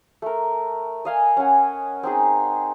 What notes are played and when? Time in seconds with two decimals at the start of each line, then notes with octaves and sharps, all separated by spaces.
0.22 A3 A#4
1.05 D#5 F5 G#5
1.37 C#4 F#5
2.03 C4 D#4 G#4